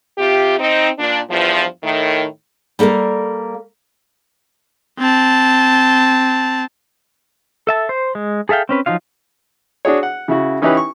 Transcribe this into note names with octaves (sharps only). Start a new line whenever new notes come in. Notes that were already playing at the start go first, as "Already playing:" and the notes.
C3 F4 G4
C4 D#4
A#2 D4
E2 G2 F3
A2 D#3
G3 A#3 A4 A#4 F5
C4 A5
A4 E5 A5
C5
G#3
G#4 A4 E5 F5 G5
C4 C#4 B4
F3 F#3 D#4 F4 F5
D4 F#4 G#4 C#5
F#5
C#3 E4 F#4
E3 C#4 D#4 E4 G4 B4
C#6